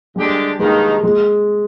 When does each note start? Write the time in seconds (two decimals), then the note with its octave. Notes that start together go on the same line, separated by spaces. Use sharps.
0.15 D3 G3 G#3 D4 G4
0.59 G2 D#3 G#3 A#3 D#4
1.04 G#3